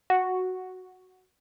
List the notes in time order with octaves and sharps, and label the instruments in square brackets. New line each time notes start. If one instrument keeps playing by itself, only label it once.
[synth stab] F#4